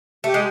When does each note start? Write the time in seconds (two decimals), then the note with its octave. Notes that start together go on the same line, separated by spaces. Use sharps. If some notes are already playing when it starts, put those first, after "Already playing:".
0.24 A3 G4
0.34 G#3